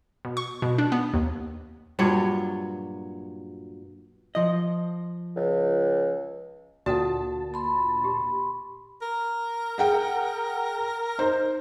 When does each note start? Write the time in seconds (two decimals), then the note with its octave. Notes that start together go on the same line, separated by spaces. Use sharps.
0.25 B2
0.37 C#6
0.62 B2
0.78 D4
0.92 B3
1.14 D#2
1.99 G2 A#2 F#3 C#5
4.35 F3 D#5
5.36 C#2
6.86 D2 A#2 F#4 A4 F#5 A5
7.54 B5 C6
8.04 G4
9.02 A#4
9.78 G#4 F#5 G5
11.19 D#4 C5